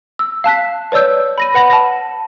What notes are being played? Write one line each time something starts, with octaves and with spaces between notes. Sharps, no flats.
E6
F5 A5 F#6 B6
B4 C#5 D5 E6 G6
B5 A#6 D#7
B4 F#5 B5 A#6
A5 A#6